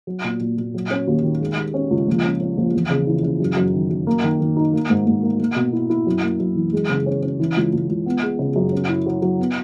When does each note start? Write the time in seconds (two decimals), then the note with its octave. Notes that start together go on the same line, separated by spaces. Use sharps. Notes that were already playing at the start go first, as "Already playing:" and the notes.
0.07 F#3
0.24 A#2
0.41 A#2
0.58 A#2
0.74 F#3
0.91 C#4
1.07 D#2
1.24 D#3
1.41 G#3
1.57 G#3
1.74 C#4
1.91 C#2
2.07 A#1
2.24 C#4
2.41 C#4
2.57 A#1
2.74 E2
2.90 C#3
3.07 E3
3.23 C#3
3.40 F#2
3.56 F#2
3.74 D#3
3.90 F#2
4.07 A#3
4.23 D#3
4.40 D#3
4.57 D#4
4.73 A#3
4.90 G#2
5.07 G#2
5.23 A#3
5.40 A#3
5.56 B2
5.73 E4
5.90 E4
6.07 F#2
6.23 A#3
6.40 F#2
6.56 E3
6.73 G#3
6.90 C#3
7.06 C#4
7.23 C#4
7.40 E3
7.56 C#2
7.73 C#2
7.89 C#2
8.06 B3
8.23 G#3
8.39 C#3
8.56 F#2
8.72 C#4
8.89 E4
9.06 F#3
9.22 F#3
9.39 B3